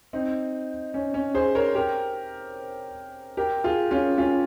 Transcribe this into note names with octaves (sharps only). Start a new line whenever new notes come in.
C4 D#4
C#4
C#4
G#4 C5
A#4 C#5
G4 A#4
G4 A#4
F4 G#4
C#4 F4
C#4 F4